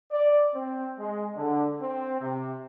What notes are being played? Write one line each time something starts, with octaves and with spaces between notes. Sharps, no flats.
D5
C4
G#3
D3
C4
C3